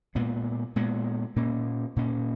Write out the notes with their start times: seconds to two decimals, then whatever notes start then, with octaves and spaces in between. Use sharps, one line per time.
0.15 A#2 G#3 B3
0.76 A#2 G#3 B3
1.36 A#2 A#3 C#4
1.96 A#2 A#3 C#4